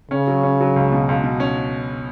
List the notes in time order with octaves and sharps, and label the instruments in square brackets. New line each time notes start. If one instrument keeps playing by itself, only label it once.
[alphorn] C#3 [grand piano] C#4
[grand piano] F#3
C#4
F#3
C#2
B2
C#2
B2
C#4